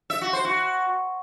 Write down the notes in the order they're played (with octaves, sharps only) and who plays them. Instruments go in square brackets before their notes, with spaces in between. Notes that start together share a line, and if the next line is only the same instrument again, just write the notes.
[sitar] E5
F#4
C5
F#4